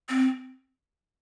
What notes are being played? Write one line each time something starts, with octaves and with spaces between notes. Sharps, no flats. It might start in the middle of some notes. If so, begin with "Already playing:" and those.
C4